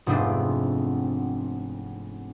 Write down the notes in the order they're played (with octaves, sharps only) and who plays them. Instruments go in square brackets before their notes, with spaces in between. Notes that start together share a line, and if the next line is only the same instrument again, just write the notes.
[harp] F1 G#2 B3 C4 D4